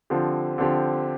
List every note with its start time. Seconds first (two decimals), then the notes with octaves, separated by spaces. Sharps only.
0.10 D3 F3 C4 G4
0.58 D3 F3 C4 G4